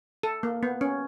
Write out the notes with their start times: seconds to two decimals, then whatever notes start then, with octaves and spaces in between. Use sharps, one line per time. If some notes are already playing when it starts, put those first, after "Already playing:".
0.23 A4
0.43 A#3
0.63 B3
0.81 C#4